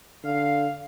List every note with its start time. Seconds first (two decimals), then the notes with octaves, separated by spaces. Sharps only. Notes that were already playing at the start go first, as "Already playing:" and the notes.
0.24 D3 F5